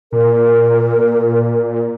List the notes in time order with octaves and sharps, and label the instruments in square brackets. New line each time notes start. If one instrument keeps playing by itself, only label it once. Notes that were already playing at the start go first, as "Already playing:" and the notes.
[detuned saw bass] A#2 [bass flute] A#4